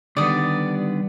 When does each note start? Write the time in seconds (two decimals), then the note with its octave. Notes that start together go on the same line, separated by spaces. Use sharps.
0.17 D3 D#3 G3 B3 D5 D#6